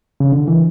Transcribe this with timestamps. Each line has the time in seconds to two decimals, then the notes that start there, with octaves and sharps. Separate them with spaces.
0.20 C#3
0.32 D3
0.48 E3